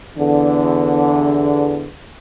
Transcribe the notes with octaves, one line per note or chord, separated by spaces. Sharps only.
E2 D3